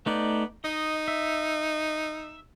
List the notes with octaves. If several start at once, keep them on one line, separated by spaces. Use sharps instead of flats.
A3 B3 D#4 D5
D#4 D#5
E5